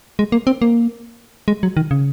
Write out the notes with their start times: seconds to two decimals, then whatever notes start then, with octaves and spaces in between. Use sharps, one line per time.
0.19 G#3
0.32 A#3
0.47 C4
0.62 A#3
1.48 G#3
1.63 F#3
1.77 D#3
1.91 C#3